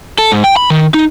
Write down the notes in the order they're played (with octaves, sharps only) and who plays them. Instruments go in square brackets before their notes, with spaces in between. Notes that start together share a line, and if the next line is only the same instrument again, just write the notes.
[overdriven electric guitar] A4
G#2
G5
B5
D#3
D#4